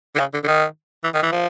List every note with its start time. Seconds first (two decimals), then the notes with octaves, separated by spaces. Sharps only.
0.15 D3
0.19 C#3
0.33 D3
0.43 D3
0.47 D#3
1.04 E3
1.14 D#3
1.22 E3
1.32 F3